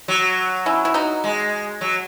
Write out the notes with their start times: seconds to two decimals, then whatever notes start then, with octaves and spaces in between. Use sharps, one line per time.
0.08 F#3
0.66 C#4 E4
0.85 E4
0.94 D#4 F#4
1.24 G#3
1.81 F#3